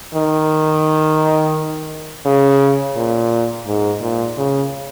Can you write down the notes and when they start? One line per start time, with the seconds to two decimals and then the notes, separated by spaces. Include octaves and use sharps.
0.15 D#3
2.26 C#3
2.96 A#2
3.67 G#2
4.01 A#2
4.38 C#3